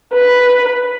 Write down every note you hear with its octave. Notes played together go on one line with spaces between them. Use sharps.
B4